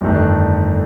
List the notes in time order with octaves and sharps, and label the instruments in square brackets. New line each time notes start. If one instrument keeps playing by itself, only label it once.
[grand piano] G1 F2 D#3 A3 D4